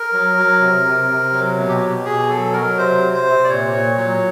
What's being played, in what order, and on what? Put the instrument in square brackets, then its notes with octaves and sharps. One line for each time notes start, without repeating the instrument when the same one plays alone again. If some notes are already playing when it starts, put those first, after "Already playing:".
Already playing: [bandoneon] A#4
F#3
F#3
C3
C3
C3
F#3
B2
G4
B2
B2 G#4
F#3 A4
F#3 A#4
C3 C5
C3
C5
C3
D5
A#2 C#5
A#2
F#3